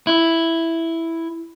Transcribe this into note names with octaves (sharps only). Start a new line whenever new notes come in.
E4